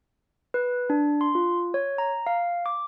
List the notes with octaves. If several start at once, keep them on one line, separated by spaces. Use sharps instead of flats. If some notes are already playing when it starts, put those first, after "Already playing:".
B4
D4
C6
F4
C#5
A#5
F5
D6